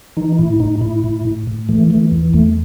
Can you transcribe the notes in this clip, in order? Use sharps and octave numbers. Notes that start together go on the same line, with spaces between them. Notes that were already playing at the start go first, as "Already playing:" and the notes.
E3 D#4
A2 E4
A2 D#4
A2 E4
A2
A2
A2
E3 A3
E3 A3
E2
E2 A3